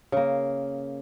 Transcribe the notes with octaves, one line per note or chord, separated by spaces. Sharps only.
C#3 A#3